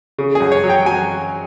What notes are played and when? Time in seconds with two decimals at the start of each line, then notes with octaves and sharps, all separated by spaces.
0.18 C#3
0.35 G#4
0.40 F#2
0.52 C#5
0.64 F#3
0.70 G5
0.86 F#3 G#5